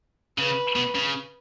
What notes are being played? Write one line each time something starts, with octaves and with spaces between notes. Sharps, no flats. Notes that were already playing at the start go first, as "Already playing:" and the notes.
C#3 B4
B2
C#3